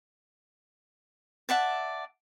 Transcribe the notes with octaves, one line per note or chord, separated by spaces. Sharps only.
D5 E5 F#5 A5